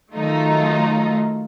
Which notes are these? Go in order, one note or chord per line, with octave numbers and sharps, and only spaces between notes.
D#3 F#3 A3 D#4 F4